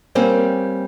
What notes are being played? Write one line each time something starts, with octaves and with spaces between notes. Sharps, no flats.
G3 A#3 C4 C#4